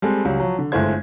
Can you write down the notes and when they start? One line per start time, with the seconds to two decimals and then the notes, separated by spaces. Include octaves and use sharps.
0.02 G3 G#3 C4 A4
0.24 C#2 F#3 G3
0.40 F3 F#3
0.59 D3
0.72 G1 G#3 A3 E4 C5 G#6